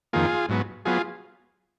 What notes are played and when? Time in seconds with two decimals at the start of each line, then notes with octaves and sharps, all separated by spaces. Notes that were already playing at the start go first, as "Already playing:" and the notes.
0.13 F2 D#3 A#3 F4 G#4
0.49 G#2 F#3 B3
0.85 F#3 B3 F4 G#4